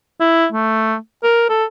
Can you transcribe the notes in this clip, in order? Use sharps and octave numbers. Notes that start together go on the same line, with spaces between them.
E4
A3
A#4
A4